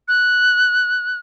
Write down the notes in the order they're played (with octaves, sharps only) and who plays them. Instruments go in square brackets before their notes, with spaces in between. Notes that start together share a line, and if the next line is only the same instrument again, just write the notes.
[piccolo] F#6